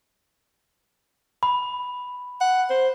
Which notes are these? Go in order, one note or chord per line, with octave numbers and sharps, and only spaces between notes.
B5
F#5
C5